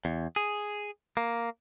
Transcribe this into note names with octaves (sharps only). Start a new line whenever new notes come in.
E2
G#4
A#3